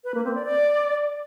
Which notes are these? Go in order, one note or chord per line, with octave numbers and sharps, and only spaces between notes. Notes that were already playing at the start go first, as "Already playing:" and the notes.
B4
A#3
C4
D5
D5